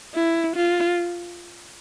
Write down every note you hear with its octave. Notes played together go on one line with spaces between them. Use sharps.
E4
F4